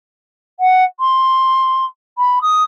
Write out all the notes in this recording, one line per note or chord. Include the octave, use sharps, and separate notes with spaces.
F#5
C6
B5
D#6